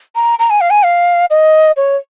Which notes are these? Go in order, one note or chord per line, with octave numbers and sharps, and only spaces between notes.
A#5
A#5
G#5
F5
G#5
F5
D#5
C#5